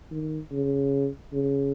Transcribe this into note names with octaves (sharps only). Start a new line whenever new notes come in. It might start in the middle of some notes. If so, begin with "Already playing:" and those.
D#3
C#3
C#3